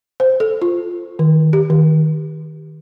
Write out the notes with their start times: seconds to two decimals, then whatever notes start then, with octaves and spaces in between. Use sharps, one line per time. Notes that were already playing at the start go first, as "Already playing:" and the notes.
0.20 C5
0.40 A4
0.62 F4
1.19 D#3
1.53 G4
1.70 D#3